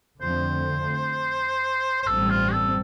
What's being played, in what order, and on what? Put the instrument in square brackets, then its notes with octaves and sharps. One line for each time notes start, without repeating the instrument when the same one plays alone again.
[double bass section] F2 D3 F3 A3 C4 [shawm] C5
[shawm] C5
[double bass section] A1 G2 G3 C4 [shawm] A4
[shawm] F4
A4